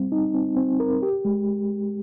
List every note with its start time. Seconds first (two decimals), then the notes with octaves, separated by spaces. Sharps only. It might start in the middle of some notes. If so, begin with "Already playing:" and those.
Already playing: G3 C4
0.12 D#4
0.34 C4
0.57 C4
0.80 A#4
1.02 G4
1.25 G#3